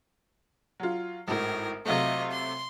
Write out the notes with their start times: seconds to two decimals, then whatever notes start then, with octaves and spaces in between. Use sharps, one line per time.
0.80 F#3 F4
1.28 G#1 A2 A#4
1.85 C3 F#3 A3 F4 D#5
2.31 C6